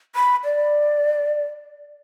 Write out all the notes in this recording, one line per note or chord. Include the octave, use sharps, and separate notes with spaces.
B5
D5